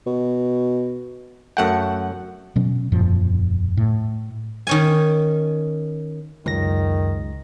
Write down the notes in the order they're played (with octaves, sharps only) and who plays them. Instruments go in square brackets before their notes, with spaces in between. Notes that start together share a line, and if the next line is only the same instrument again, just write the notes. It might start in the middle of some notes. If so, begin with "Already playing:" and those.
[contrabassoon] B2
[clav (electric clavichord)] F#2 A3 G5 [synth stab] F#5
[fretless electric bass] B2 F#3 C#4
E1 F#2 A#2 F3
A2
[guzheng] D#3 C#4 G#5
[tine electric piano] C#2 A#6 [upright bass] F#2 [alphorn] D#3